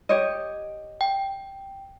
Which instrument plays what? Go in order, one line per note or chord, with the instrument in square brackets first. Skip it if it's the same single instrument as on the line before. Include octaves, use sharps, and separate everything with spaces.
[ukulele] G4 C#5 D#5
[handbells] G5